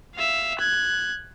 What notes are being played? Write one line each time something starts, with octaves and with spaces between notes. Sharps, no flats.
E5 F5
F#6 G#6